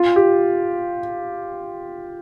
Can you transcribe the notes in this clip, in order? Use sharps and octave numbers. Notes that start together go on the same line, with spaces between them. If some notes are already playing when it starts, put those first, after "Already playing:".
Already playing: F4
G4